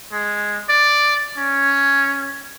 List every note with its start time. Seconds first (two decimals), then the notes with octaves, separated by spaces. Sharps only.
0.12 G#3
0.69 D5
1.38 C#4